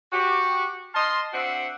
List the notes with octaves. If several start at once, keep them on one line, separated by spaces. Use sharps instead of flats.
F#4 G4
D#5 F5 A5 C6
C4 D4 F#4 E5 F#5